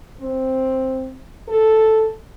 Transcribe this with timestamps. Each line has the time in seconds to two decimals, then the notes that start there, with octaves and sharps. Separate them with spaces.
0.21 C4
1.48 A4